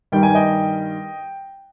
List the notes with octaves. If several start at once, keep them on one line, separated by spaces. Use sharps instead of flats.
G2 D#3 G3 G5
G#5
D#5 G5